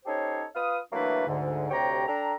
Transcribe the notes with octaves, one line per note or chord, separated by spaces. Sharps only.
C#4 D#4 G4 A4 C5 C#5
F4 B4 F5 D#6
E3 F#3 A3 A#3 D4 B4
D2 G#2 D3
D2 C3 G4 C#5 G5 A#5
D4 A4 G5 A#5